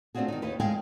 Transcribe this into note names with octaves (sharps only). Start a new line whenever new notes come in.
A3 C4 D4 F4 F#4 G#4
D#3 D#4
D#2 D#4 G4 B4
G2 G#3 F5 G5 G#5